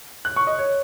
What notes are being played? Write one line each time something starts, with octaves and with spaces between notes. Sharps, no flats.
F#6
C#6
D#5
C#5